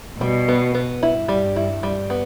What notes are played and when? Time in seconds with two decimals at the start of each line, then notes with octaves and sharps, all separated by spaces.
0.20 B2 G3
0.48 B3
0.74 B3
1.01 G2 E4
1.28 G3
1.56 E4
1.83 G3
2.10 B3